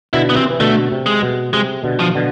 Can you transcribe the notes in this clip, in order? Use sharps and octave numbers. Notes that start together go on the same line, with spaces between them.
B2 D3 E4
B3
C3 E3 C4
E3
B2 D3 A3
C3
G#3
B2
C3 G#3
B2 D3
F3
B2 D3